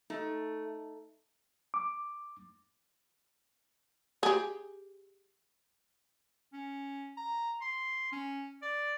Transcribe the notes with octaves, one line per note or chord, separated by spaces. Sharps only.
A3 D#4
D6
G4 G#4
C#4
A#5
C6
C#4
D5